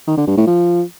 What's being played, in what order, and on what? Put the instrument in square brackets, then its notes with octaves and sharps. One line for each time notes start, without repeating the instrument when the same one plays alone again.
[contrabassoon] D#3
D3
G2
A2
F3